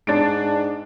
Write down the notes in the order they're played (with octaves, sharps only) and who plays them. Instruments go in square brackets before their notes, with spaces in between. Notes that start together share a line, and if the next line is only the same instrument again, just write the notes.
[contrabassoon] G#2 [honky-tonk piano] D4 D7